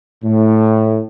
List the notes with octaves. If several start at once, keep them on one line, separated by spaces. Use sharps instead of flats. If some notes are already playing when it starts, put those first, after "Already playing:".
A2